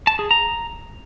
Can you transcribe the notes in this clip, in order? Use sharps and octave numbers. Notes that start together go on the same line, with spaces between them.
A5
G#4
A#5